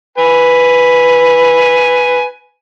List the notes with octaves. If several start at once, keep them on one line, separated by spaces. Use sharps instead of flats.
B4 G#5